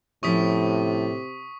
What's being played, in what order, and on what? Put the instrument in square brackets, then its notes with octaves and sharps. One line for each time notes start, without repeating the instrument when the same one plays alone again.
[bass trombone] A2 [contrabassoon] C3 [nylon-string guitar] F3 C#4 E4 [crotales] C#6 D#6 B6